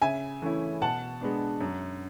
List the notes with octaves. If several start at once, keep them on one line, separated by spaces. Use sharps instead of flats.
C#3 E5 G#5
E3 A3 C#4 E4
B2 F#5 A5
G#3 B3 D4
F#2